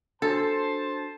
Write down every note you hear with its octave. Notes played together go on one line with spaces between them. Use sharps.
D4 F#4 A4 C5 A5 A6